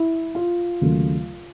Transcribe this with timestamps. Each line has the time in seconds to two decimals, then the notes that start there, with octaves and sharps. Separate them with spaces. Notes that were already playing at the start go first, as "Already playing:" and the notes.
Already playing: E4
0.35 F4
0.81 D#2 C#3 F#3 A3